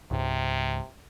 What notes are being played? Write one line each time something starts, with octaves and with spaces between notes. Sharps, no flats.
C#2 G#2 C3